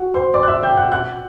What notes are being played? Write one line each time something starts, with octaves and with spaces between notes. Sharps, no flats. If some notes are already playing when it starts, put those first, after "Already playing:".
Already playing: F#4 F#5
C5 C6
D5 D6
F#6
E5 E6
G5 G6
F#5 F#6
F#5 F#6